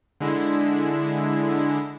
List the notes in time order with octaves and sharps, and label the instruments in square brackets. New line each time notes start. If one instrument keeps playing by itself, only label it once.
[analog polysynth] D3 G#3 E4